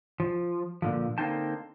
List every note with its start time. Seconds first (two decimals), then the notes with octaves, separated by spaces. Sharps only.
0.20 F3
0.82 A#2 D3 F3
1.18 D3 A#3 C4 D#4 G5 A5